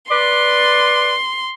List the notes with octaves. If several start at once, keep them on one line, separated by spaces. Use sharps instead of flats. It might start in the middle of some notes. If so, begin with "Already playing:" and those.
B4 D5 C6